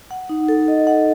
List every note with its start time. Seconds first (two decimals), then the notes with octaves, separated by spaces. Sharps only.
0.11 F#5
0.29 D#4
0.49 A4
0.68 D#5
0.87 F#5